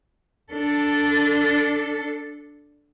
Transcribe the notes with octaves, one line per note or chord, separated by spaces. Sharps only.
D4 A4